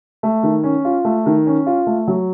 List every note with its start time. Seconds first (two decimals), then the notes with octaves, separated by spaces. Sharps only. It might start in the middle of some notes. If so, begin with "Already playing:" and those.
0.23 A3
0.43 D#3
0.64 C#4
0.85 F4
1.05 A3
1.26 D#3
1.47 C#4
1.67 F4
1.87 A3
2.08 F#3